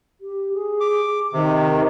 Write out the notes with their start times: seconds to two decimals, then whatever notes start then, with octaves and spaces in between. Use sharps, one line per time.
0.21 G4
0.54 G#4
0.81 D6
1.33 C3 D#3